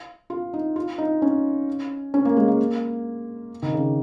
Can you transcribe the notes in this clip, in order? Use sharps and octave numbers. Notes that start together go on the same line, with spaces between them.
F4
D#4
F4
D#4
C#4
C#4
A#3
G#3
A#3
D#3
C#3